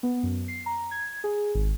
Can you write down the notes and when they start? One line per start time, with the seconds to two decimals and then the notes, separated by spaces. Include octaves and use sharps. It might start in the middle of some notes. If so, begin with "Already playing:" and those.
0.03 B3
0.23 F#2
0.48 C7
0.66 A#5
0.91 G#6
1.24 G#4
1.55 G#1